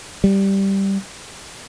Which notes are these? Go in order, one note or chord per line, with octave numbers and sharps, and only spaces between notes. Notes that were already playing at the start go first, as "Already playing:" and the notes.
G3